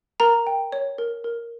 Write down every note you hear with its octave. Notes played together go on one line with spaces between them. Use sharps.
A#4 A#5
G5
C#5
A#4
A#4